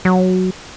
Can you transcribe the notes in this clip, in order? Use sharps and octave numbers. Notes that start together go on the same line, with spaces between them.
F#3